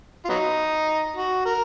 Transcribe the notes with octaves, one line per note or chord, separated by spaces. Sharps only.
F4
F#3 B3 D#4
F#4
A#4